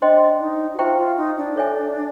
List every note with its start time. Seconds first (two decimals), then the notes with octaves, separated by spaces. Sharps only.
0.01 D4 C5 D#5 G5 C6
0.40 D#4
0.74 F#4
0.79 F4 C5 E5 G5 A#5 C#6
0.98 F4
1.17 D#4
1.37 D4
1.56 A4 C#5 E5 G#5